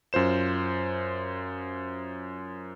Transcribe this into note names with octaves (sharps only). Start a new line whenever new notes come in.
F#2 F4 C5 E7